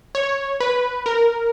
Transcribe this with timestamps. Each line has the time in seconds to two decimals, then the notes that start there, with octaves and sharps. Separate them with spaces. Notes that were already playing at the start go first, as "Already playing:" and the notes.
0.15 C#5
0.60 B4
1.06 A#4